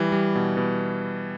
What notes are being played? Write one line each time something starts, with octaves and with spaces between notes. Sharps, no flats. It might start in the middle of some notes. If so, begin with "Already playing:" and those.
Already playing: E3 G3
G3
B2
B2